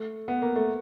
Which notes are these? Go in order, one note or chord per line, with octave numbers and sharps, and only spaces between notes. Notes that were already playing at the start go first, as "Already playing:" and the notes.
Already playing: A3
B3
A#3
A3